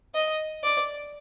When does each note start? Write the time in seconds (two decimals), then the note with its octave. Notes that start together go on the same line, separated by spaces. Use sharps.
0.15 D#5
0.64 D5